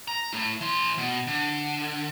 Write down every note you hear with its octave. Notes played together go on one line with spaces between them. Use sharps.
A#5
A3 E4
E3 C6
B2
D3